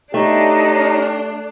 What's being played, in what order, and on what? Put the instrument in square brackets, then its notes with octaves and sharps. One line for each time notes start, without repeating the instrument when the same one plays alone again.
[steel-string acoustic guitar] A3 [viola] D4 [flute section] D#4 C#5 [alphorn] G4